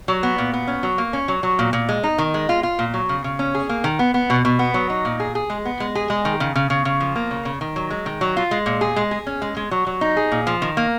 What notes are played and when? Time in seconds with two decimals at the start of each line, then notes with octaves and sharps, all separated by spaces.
0.08 F#3
0.23 B3
0.38 A#2
0.53 B3
0.67 C#4
0.83 F#3
0.98 A#3
1.13 C#4
1.28 F#3
1.43 F#3
1.59 A#2
1.73 A#2
1.89 G#3
2.04 D#4
2.18 D#3
2.34 G#3
2.49 F4
2.63 F4
2.79 A#2
2.94 F#3
3.09 C#3
3.24 C#3
3.39 C#4
3.55 G#4
3.69 A#3
3.84 D#3
3.99 B3
4.14 B3
4.30 B2
4.45 B2
4.59 B3
4.74 F#3
4.90 D#4
5.05 A#2
5.20 G#4
5.35 G#4
5.50 G#3
5.65 B3
5.80 G#3
5.95 G#4
6.10 G#3
6.25 D#3
6.40 C#3
6.55 C#3
6.70 C#3
6.85 C#3
7.00 F3
7.16 A#3
7.31 C#3
7.45 C#3
7.61 D#3
7.76 F#3
7.90 G#3
8.06 D#3
8.21 F#3
8.37 F4
8.51 G#3
8.66 A#2
8.81 G#4
8.96 G#3
9.11 G#4
9.27 C#4
9.42 G#3
9.57 G#3
9.71 F#3
9.87 F#3
10.01 D#4
10.17 G#4
10.32 A#2
10.47 F3
10.62 D#3
10.77 A#3